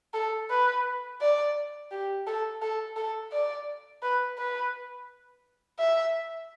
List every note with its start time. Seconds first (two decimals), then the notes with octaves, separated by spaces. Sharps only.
0.14 A4
0.50 B4
1.21 D5
1.91 G4
2.27 A4
2.62 A4
2.96 A4
3.32 D5
4.02 B4
4.37 B4
5.79 E5